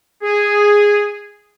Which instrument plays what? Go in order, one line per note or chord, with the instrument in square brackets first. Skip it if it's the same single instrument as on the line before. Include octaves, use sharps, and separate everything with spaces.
[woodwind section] G#4